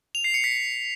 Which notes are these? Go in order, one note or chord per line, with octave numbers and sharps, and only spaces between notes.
F7
C7
C#7
B6